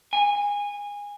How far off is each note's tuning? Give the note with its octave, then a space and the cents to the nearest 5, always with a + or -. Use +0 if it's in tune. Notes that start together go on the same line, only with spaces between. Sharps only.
G#5 -20